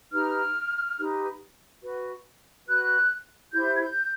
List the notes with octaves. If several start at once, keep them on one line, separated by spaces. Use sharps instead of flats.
D#4 G4 B4 F6
D#4 G4 B4
F#4 B4
F#4 B4 F#6
E4 G4 C5 G6
G#6
G6